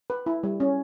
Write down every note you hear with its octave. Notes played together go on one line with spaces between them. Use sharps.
B4
E4
G3
C#4